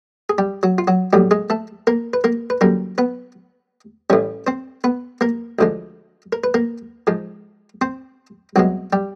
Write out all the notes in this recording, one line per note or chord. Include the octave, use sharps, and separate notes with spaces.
G#4
G3 G4
F#3 F#4
F4
F#3 F#4
A#1 A2 F#3 G3 G4
G#3 G#4
A3 A4
A#3 A#4
B4
A#3 A#4
B4
F#2 D3 G3 A#3 A#4
B3 B4
A1 A2 E3 G3 C#4 C#5
C4 C5
B3 B4
A#3 A#4
D2 D3 F3 G#3
A#4
B4
A#3 A#4
G#2 F3 G#3
C4 C5
C2 B2 F#3 G#3 F#4
G3 G4